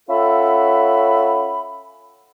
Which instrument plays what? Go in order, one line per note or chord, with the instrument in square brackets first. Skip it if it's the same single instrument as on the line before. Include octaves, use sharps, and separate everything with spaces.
[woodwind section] C#4 F4 A4 E5 F#5 B5